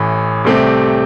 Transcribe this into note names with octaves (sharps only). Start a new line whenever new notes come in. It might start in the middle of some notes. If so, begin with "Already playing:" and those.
Already playing: A1 A2 E3
C2 C3 A3 C4 G4